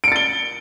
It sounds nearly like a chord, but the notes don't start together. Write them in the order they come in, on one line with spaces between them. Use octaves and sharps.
D7 C#7 A6 G7